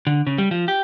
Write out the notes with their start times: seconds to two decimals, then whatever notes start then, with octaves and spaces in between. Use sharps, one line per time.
0.07 D3
0.27 C#3
0.38 G3
0.51 F3
0.68 G4